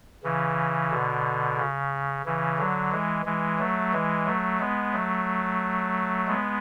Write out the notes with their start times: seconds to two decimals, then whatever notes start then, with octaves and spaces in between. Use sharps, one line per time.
0.24 C#3 E3
0.91 B2 D3
1.57 C#3
2.26 C#3 E3
2.58 D3 F#3
2.92 E3 G#3
3.25 E3 G#3
3.59 F#3 A3
3.93 E3 G#3
4.26 F#3 A3
4.60 G#3 B3
4.93 F#3 A3
6.27 G#3 B3